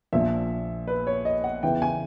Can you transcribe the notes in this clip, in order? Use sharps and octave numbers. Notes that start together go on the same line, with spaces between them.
A#1 A#2 F3 E5
B4
C#5
D#5
F#5
E2 C#3 E3 G5
G#5